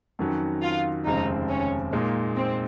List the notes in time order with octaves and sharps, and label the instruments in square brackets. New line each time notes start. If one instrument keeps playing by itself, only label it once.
[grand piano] F2 D#3 F#3 C#4 F#4
[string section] F4
[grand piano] F1 D#2 C#3 G#3 C4 [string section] D#4
[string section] C#4
[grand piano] A#2 G#3 D#4 [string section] A#3
[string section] C4